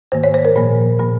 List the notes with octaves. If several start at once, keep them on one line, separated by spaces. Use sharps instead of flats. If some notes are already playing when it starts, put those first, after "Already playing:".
G#2 D#3 A#3 C5
C#5
C5
A#4
A#2 F3 A#3
A#2 F3 A#3